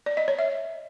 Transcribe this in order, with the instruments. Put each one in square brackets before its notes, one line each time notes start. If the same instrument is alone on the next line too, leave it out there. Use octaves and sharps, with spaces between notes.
[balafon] D5
D#5
C#5
E5